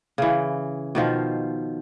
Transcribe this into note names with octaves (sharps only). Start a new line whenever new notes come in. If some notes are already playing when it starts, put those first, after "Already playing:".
C#3 E3
B2 D#3 F3 F4